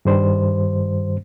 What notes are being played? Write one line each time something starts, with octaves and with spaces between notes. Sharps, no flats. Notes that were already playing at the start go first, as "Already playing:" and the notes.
G2 D#3 G3 C5